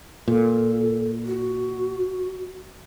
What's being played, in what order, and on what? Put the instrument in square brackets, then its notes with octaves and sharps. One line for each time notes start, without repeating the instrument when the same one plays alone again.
[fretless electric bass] A#2 [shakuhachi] A4
[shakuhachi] F#4